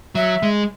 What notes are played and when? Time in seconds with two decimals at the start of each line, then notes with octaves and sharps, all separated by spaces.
0.15 F#3 E5
0.43 G#3